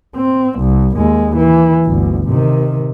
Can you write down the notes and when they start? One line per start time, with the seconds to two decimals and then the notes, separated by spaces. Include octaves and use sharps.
0.16 C4
0.60 C2
0.96 D#2 G#3
1.37 E3
1.85 G1 D2
2.29 C3 D#3